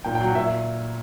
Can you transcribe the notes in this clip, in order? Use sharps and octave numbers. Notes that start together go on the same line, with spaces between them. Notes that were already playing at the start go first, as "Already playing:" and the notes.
A#2 G5
G5
F#3 F#5
A#2 E5